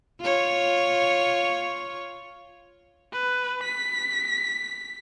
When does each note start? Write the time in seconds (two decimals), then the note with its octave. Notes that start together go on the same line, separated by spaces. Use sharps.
0.21 F4 C#5
3.13 B4
3.63 B6